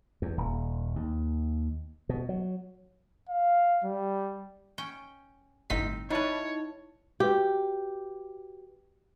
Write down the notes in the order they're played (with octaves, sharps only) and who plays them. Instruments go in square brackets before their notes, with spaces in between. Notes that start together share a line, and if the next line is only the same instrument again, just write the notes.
[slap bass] E2
D#1
D#2
B2
F#3
[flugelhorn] F5
G3
[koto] C#4 G5
[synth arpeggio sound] G1 A2 B6 [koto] C4 D#4 F5
[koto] G3 B4 [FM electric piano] D#4 E4 A5 [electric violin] C#5
[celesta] F#4 B4 [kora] G4